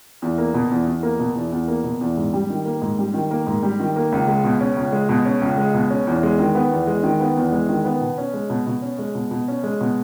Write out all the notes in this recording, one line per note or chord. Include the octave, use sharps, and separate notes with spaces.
E2
A#3
B2
E2
E2
A#3
B2
E2
E2
A#3
B2
E2
G#2
G3
D#3
A#3
G#2
G3
D#3
A#3
G#2
G3
D#3
A#3
C#2
G#3
B2
C#4
C#2
G#3
B2
C#4
C#2
G#3
B2
C#4
E2
G#3
D#3
B3
E2
G#3
D#3
B3
E2
G#3
D#3
B3
B2
C#4
G#3
B2
B2
C#4
G#3
B2
B2
C#4
G#3
B2